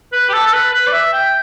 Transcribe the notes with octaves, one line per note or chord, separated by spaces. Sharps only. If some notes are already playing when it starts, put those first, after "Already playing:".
B4
G4
A4
A4
B4
B4
D5
E5
G5